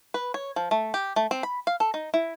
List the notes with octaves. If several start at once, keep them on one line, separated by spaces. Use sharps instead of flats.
B4
C#5
F3
A3
G4
A3
C4
B5
F5
A4
D#4
E4